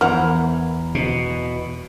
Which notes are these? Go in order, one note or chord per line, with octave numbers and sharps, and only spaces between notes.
E2 E4 A#4 C5 F#5 A#5
B2